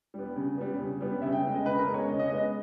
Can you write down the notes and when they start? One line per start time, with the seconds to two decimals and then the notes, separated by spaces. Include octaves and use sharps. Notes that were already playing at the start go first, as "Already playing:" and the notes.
0.14 G3 B3
0.36 C#3
0.58 G3 B3
0.79 C#3
1.01 G3 B3
1.22 C#3 E5
1.32 G5
1.43 G#3 B3
1.54 D#5
1.65 C#3 B4
1.79 A#4
1.87 G#3 B3
1.94 C#5
2.08 C#3 D#5
2.19 D#5
2.29 G#3 B3 D#5